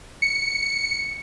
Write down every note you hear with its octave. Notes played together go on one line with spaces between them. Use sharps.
C#7